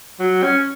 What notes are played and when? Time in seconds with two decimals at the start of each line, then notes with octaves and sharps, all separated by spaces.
0.20 F#3
0.43 C#4